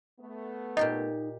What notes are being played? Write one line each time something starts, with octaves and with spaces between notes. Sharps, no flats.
A3 B3
A#2 D#4 G4 D#5 C6